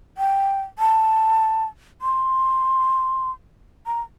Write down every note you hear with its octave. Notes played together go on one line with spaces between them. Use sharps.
G5
A5
C6
A#5